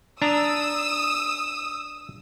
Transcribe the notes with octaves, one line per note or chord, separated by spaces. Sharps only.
D4 A#5 D#6 E6